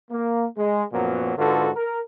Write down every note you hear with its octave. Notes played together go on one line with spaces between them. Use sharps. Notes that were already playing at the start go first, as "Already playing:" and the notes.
A#3
G#3
F#2 A#2 F3 F#3 B3
G#2 D3 F4 F#4 A4 B4
A#4